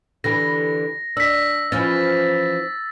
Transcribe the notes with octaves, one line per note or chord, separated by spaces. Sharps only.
D3 E3 G4 A#6
D4 E6 B6
E3 F3 C#4 A6